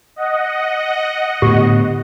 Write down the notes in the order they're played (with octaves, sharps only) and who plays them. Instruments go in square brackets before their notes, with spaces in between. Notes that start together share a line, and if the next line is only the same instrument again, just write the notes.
[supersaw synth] D#5 F#5
[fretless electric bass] A2 D3 B3 [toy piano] G4